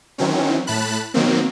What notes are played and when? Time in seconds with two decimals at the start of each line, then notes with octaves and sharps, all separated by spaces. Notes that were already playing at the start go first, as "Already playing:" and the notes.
0.18 D#3 E3 F#3 C4 C#4
0.67 A2 A5 B5 F#6
1.14 B2 D#3 F#3 A#3 C4